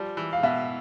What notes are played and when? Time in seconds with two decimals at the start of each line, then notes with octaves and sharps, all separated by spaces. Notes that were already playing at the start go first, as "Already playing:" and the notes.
Already playing: F3 G3
0.17 E3
0.33 F5
0.43 B2 E5